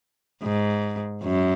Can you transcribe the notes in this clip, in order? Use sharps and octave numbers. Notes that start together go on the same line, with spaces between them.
G#2
F#2